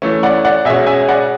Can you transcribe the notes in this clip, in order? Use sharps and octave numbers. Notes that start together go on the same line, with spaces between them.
E3 A3 C#4
D5 F#5
D5 F#5
B2 G#3 C#4 E5 G#5
E5 G#5
D5 F#5